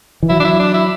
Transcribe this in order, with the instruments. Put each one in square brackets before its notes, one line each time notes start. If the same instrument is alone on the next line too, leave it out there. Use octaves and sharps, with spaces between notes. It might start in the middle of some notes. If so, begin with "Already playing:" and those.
[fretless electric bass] E3
[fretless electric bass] F#3 [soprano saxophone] E4
[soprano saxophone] D4
E4
D4
E4